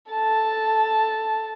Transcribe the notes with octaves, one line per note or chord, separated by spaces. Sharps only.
A4 A5